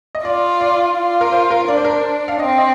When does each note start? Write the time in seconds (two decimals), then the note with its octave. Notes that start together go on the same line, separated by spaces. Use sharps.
0.15 D#5
0.25 F4 D5
0.61 D5
0.97 F4
1.21 A#4
1.32 C5
1.50 A#4
1.68 D4 D5
1.76 C5
1.84 A#4
1.92 C5
2.28 F5
2.39 C4 D#5
2.58 D#5